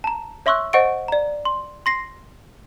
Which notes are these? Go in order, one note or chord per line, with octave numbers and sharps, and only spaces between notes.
A5 A#5
C#5 E5 C6 C#6 E6 F#6
C5 D#5 F#5 C#6 A6 D7
D5 A#5
C6
C6 A#6 C7